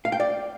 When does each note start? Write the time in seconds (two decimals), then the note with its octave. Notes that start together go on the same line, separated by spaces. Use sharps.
0.05 F5
0.12 G5
0.20 D5